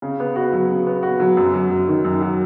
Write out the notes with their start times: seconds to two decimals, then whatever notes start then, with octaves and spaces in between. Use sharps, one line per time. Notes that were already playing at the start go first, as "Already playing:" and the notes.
0.02 C#3
0.20 B3
0.36 F#4
0.53 F#3
0.69 C#3
0.86 B3
1.03 F#4
1.20 F#3
1.37 F#2
1.54 F#3
1.70 F#2
1.87 D#3
2.05 F#2
2.21 F#3